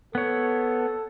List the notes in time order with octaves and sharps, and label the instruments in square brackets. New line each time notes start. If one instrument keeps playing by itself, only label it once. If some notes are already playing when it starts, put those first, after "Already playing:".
[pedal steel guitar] B3 C#5 [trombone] A4